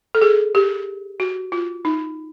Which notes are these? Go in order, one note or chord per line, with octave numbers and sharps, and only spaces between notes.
A4
G#4
G4
F#4
F4
D#4